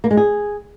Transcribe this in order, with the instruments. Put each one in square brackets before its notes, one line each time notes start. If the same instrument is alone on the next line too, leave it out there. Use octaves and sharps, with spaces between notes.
[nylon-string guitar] A#3
G#3
G#4